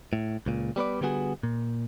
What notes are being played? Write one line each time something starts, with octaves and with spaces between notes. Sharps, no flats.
A2
C#2 A#2
G3 B3 B4 D5
D3 G3 B3 F#4 G#4
A#2